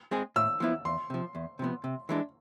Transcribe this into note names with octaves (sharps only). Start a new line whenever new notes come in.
G#3 C4 G#4
A2 E6
F3 B3 E4
E2 C6
C3 F3
E2
C3 F3 B3
C3
E3 G#3 D4